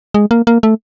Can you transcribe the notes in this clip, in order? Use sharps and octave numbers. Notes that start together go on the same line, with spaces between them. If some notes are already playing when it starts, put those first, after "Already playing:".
G#3
A#3
A#3
A3